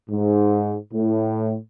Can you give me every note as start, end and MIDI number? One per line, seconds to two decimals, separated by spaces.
0.10 0.77 44
0.93 1.56 45